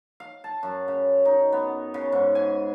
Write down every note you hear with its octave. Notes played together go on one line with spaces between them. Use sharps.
F5
A5
F#2
C#3
D#4
B3
C#3
G#2
G#5